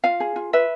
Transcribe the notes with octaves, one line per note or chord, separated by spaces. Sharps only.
F4 F5
G#4
F4
B4 E5